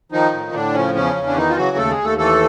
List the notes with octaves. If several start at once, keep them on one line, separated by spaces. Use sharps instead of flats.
D#3 F3 D#4
A2
A2 D3 D4
C#3 F3 C#4
E2 C#3 C#4
E2
D4
D#3 E3 D#4
F4
C#3 F#3 F#4
D#2 A3 A4
G#3 G#4
D#2
A3 A4
E3 A3 A4